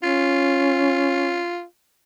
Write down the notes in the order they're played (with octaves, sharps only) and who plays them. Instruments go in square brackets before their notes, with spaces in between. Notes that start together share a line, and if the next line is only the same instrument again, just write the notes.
[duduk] C#4 [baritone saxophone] F4